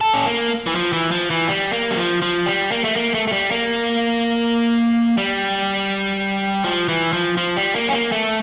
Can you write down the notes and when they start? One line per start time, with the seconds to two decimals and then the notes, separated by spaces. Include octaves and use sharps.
0.01 A4
0.14 C#4
0.26 A#3
0.67 E3
0.75 F3
0.93 E3
1.11 F3
1.30 E3
1.48 G3
1.73 A#3
1.91 G3
1.97 F3
2.22 F3
2.46 G3
2.72 A#3
2.84 A3
2.96 A#3
3.14 A3
3.27 A3
3.32 G3
3.51 A#3
5.17 G3
6.64 F3
6.88 E3
7.13 F3
7.37 F3
7.56 G3
7.75 A#3
7.88 C#4
7.92 A#3
8.12 A3